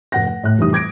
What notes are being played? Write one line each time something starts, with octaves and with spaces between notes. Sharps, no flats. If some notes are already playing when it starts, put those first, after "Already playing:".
F1 F#5 A#6
F#5
A2 F#6
F1 E3 G3 D#4 D#6
D6 G#6 A#6 D7